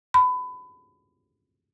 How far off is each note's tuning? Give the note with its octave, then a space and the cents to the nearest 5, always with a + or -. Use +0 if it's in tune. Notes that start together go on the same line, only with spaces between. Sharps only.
B5 +25